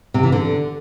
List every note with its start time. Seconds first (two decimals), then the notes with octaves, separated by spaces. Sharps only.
0.14 C3
0.23 E3
0.32 D3